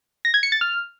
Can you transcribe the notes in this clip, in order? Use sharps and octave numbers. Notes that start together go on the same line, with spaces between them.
A#6
G#6
C#7
A6
F6